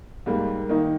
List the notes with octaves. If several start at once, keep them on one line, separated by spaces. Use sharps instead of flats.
G#2 G3 A#3
D#3 A#3 D#4